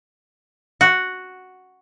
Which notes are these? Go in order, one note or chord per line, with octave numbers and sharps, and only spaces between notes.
F#4